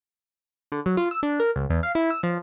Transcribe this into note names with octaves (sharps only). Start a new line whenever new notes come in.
D3
F#3
F4
E6
D4
A#4
C#2
E2
F5
E4
E6
F3